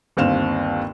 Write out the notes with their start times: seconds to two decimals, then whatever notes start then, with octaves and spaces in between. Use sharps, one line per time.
0.17 G1 D#2 C4 F5 E7